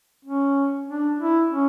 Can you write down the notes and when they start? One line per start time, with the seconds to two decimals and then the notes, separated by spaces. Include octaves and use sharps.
0.25 C#4
0.87 D4
1.19 E4
1.50 C#4